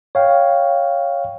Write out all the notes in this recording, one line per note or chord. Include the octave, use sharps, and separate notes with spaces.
C#5 F5 G5